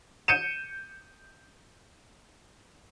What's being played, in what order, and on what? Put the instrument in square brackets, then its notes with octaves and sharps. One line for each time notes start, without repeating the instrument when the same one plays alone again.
[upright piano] G6 C#7 D#7 E7